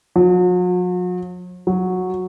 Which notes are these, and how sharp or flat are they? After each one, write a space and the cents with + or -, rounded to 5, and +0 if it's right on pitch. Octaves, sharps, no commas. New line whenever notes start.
F#3 -45
F#3 -10